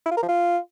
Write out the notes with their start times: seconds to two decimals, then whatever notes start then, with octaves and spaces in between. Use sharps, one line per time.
0.06 E4
0.11 F4
0.17 A#4
0.23 F3
0.29 F4